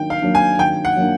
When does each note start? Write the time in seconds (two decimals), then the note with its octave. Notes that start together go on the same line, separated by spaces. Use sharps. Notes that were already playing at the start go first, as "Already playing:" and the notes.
Already playing: D#3 F#3 A#3 D4 G5
0.10 F5
0.22 F#3 A#3 D4
0.35 G#5
0.59 D#3 G5
0.85 F#5
0.96 F#3 A#3 D4